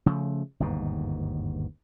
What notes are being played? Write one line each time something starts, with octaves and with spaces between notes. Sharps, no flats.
C#3 F3 A3
G1 D#2 G#2 B2